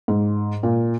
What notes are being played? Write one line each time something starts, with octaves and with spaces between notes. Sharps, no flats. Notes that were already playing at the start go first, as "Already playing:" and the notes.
G#2
A#2